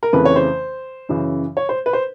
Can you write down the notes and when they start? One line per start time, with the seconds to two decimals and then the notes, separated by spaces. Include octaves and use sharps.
0.03 A#4
0.13 F2 C#3 E3 A3 B4
0.25 C#5
0.36 C5
1.09 F#2 C#3 E3
1.57 C#5
1.69 C5
1.86 B4
1.93 C5